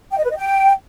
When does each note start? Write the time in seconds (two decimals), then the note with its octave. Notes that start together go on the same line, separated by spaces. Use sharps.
0.12 G5
0.18 D#5
0.24 B4
0.30 D#5
0.36 G5